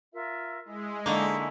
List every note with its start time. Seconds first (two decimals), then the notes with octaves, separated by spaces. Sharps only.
0.13 F4 A#4 E5
0.65 G#3 E4
1.06 D3 A#3 D#4 E4 G#5 C#6